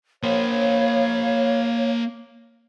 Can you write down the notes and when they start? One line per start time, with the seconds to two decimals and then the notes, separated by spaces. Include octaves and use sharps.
0.23 A#3 C5 C#5 F5